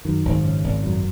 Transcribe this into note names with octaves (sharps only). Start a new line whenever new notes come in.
F#2 D#3
G#1
C#3
G#1
F#2